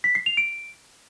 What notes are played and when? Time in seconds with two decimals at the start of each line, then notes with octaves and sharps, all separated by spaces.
0.04 B6
0.15 C7
0.26 F7
0.37 D7